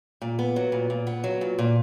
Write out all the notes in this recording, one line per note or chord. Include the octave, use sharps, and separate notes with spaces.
A#2
B3
F#3
A#2
A#2
B3
F#3
A#2
A#2